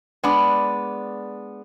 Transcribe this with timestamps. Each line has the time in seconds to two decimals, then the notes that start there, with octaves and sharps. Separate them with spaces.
0.23 G#3 B3 D4 D5